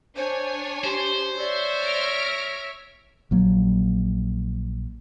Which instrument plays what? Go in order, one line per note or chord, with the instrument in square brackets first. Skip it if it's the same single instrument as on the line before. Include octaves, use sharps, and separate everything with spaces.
[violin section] D4 C#5 G#5 [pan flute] C5
[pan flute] G4 [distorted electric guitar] C5
[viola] C#5 E5 [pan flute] D5
[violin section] F6 A#6 D7
[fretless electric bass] A#1 F#3 A#3